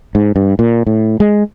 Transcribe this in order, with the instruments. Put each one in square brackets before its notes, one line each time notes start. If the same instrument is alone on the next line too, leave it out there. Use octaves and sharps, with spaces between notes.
[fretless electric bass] G#2
G2
A#2
A2
G#3